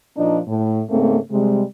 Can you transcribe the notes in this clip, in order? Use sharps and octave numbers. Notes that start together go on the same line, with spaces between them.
A#2 F3 D4 D#4
A2
G#2 C#3 A3 A#3 C4
C3 G3 G#3